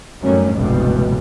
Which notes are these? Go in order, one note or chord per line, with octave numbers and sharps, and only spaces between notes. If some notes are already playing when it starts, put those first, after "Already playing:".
F#2 D#3 F#3 G3 A3 C#4
F1 C#2 G2 B2 E3 G3